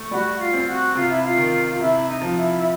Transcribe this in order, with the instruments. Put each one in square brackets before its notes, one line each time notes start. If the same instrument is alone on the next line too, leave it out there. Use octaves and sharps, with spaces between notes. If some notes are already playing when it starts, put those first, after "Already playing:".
Already playing: [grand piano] A3
[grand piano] G3 [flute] F#4
[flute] F4
[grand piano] C4
[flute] F#4
[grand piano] C3 [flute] F4
[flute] E4
F4
[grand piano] D#3
[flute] F4
[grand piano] C3 [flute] E4
[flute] D#4
[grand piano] F3
[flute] E4
E4